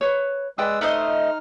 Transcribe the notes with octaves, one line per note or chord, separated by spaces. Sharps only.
B4 C#5
G#3 B4 D5 G5 D#6 E6
A3 D#4 C5 D#5 F6